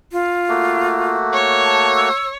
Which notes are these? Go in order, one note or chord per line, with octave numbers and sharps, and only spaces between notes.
F4
A3 A#3 F#4
C#5
A5
E6